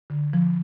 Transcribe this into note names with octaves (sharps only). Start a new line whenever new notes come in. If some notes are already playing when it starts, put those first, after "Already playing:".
D3
F3